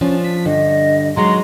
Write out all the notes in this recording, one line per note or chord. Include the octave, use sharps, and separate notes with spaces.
F3 C#4 D4
B6
G2 D3 D#5
D#3 F#3 G#3 A#5 C6